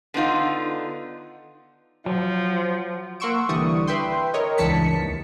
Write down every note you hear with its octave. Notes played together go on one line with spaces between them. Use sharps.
D3 B3 D#4 F4
F3 F#3
A#3 F#5 C6 C#6 E6 D7
C2 D3 E3 G3 C#6 D#6
B4 E5 G5 C6
A#4 C#5 D#5
C#2 G2 E3 A5 B6 C#7
D#2